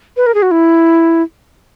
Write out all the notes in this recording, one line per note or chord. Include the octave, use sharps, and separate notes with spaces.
B4
A#4
G#4
F#4
E4